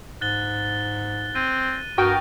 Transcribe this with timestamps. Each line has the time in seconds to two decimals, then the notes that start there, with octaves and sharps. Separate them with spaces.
0.21 G#2 F#6 A6 G7
1.35 C4 D#7
1.98 G2 F#4 A#4 G5 D#6 G6 A#6